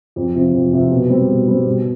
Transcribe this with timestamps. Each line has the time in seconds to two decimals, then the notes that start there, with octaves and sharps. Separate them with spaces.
0.16 F2
0.35 C3 F3 C4
0.53 F2
0.73 C3 F3 C4
0.91 B2
1.09 G3 C4
1.29 B2
1.48 G3 C4
1.65 B2